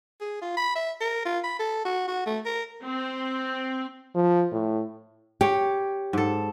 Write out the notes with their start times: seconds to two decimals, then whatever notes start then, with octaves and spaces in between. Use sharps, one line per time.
0.21 G#4
0.42 F4
0.57 B5
0.75 E5
1.01 A#4
1.25 F4
1.44 B5
1.59 A4
1.85 F#4
2.08 F#4
2.26 A3
2.46 A#4
2.83 C4
4.15 F3
4.52 A2
5.41 G4 C#5
6.13 G#2 A4